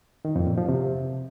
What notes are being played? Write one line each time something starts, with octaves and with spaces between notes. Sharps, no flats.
D#3
F2
A#2
F3
C3